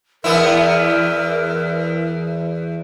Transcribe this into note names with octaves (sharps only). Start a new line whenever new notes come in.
E2 B3 E4 A#4